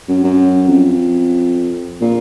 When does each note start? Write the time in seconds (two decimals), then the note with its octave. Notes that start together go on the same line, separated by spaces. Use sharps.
0.09 F#2
0.24 F#2
0.68 F2
2.01 A#2